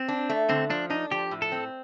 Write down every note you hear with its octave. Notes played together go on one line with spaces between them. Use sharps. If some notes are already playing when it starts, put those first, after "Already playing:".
Already playing: C4
D4
A3
D3 C4
F3 D4
D4 D#4
F3 G4
A2
A4
C4